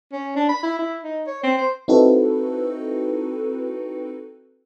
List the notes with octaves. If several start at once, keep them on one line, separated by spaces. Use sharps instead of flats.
C#4
D4
B5
E4
E4
D#4
C#5
C4
C5
C4 D#4 E4 F#4 A4 B4